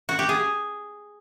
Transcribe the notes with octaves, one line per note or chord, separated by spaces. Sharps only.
F#4
G4
G#4